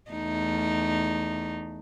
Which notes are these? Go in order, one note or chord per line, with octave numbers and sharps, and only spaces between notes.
E2 A3 D#4